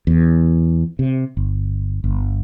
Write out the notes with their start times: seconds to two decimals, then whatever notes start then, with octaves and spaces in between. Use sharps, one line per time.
0.07 E2
0.99 C3
1.37 G1
2.04 G1